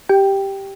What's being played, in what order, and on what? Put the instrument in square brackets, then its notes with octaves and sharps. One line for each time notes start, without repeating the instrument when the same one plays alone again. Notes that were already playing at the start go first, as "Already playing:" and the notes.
[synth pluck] G4 G5